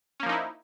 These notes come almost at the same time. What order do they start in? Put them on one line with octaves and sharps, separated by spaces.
C#4 A#3 F3 D#4 E4